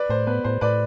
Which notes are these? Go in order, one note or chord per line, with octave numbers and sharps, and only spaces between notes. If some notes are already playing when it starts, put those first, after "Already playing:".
Already playing: B4 D5
A2 C5
B3 B4
A2 C5
A2 B4 D5